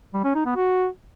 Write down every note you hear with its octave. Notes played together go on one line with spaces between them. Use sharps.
G3
C#4
D#4
B3
F#4